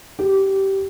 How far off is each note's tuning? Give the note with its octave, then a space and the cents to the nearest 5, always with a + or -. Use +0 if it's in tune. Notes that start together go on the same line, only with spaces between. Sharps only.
G4 -15